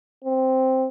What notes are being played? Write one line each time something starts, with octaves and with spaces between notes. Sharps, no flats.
C4